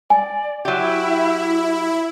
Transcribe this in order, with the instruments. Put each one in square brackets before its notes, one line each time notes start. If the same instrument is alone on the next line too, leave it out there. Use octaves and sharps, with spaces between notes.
[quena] D5 [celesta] G#5
[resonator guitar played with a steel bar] F#3 G4 [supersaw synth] E4 [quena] E5